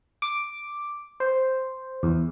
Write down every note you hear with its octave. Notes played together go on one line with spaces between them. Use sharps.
D6
C5
E2